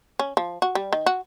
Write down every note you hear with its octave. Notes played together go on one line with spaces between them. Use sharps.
C#4
F3
F#4
G3
D#3
F#4